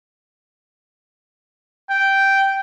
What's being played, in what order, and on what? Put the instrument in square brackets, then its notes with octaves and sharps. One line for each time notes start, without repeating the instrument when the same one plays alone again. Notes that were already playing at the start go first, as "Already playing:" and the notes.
[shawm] G5